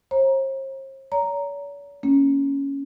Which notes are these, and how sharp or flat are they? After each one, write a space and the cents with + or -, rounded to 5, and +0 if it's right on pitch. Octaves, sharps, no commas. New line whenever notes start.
C5 +45 A#5 +15
C#5 +45 A#5 +0
A#3 +0 C#4 +0